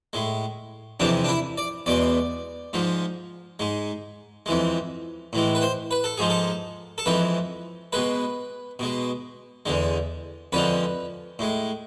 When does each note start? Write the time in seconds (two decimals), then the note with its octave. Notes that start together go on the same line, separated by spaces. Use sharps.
0.13 A2 G#3
1.00 F2 C3 E3 G#3 D4
1.24 D4
1.29 E4
1.58 D5
1.86 E2 B2 G#3 D5
2.73 G#2 F3 G#3
3.59 G#2 G#3
4.46 F2 E3 G#3
5.33 A2 E3 G#3
5.55 B4
5.62 C5
5.91 B4
6.04 A4
6.18 G#2 F3 G#3 G#4
6.30 A4
6.98 A4
7.06 F2 E3 G#3 B4
7.93 B2 G#3 B4
8.79 B2 G#3
9.66 E2 D3 G#3
10.52 F2 D3 F3 G#3 B4
11.39 A2 G#3